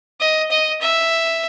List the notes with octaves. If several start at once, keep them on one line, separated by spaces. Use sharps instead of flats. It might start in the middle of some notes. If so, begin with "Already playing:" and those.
D#5
D#5
E5